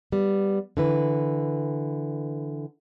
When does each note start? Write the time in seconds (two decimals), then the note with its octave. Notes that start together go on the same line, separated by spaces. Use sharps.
0.12 G3 B3
0.77 D3 E3 B4